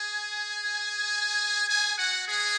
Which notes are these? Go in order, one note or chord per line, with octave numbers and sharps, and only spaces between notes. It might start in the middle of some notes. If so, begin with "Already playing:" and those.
Already playing: G#4 G#5
G#4 G#5
F#4 F#5
G#3 G#4